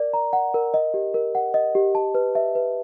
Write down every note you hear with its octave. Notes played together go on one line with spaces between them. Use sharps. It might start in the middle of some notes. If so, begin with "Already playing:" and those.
Already playing: A#4 D5
A#5
F#5
A#4
D#5
G4
A#4
F#5
D#5
G4
A5
B4
E5
B4